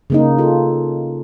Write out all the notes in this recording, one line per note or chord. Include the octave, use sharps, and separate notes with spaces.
C#3 A#3 D#4
F4 A4